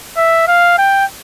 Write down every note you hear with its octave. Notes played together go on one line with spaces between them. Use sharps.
E5
F5
G5